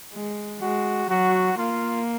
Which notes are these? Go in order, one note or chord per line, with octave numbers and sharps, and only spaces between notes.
G#3
G#3 F#4
F#3 F#4
A#3 F4